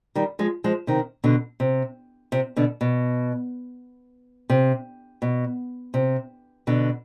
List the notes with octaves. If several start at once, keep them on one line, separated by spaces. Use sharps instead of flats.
D#3 G3
F3 G#3
F3 G#3
C3 D#3
B2 D3
C3
C3
B2 D3
B2
C3
B2
C3
B2 D3